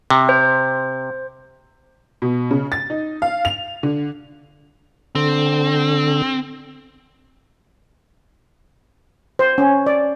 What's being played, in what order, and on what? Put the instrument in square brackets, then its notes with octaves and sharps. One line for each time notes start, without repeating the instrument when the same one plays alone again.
[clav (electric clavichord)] C3
[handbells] C5
[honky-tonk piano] B2
C#3
A6
D#4
F5
F7
D3
[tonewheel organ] D3 [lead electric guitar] C4
[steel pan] C5
C#4
D5